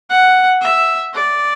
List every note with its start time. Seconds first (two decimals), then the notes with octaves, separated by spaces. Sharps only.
0.10 F#5
0.61 E5
1.14 D5